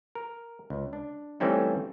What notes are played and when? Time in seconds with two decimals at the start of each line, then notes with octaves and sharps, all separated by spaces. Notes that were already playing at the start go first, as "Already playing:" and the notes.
0.15 A#4
0.70 C#2
0.93 D4
1.40 E3 G3 A3 C4 C#4 D#4